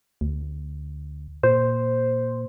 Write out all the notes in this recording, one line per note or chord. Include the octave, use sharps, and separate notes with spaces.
D2
A#2 C5